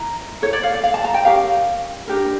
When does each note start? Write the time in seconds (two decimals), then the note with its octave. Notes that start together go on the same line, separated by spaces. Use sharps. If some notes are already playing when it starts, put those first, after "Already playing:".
Already playing: E4 A#5
0.42 E4 A4 C#5
0.53 D5
0.63 F5
0.74 D5
0.84 F5
0.94 A5
1.05 A#5
1.14 G5
1.25 C#4 G4 A#4 F5
2.07 D4 G4 A#4